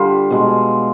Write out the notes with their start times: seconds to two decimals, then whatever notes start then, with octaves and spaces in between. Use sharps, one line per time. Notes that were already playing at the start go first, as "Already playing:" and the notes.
Already playing: D3 G3 F4
0.30 B2 G#3